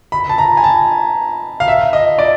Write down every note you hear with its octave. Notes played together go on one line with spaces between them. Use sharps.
B5
A5
A#5
G#5
A5
F5
E5
D#5
D5